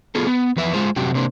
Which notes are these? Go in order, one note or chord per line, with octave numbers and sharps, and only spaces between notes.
B3 F4 G#4 A4
B3
E2 F3 B4 E5
G#3 F4 G#4 C5
F#2 C3 F#4 G4
C3 A#3 D4 B4 C5